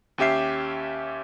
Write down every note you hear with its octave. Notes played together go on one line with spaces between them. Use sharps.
D#2 C#4 G4 E5 C7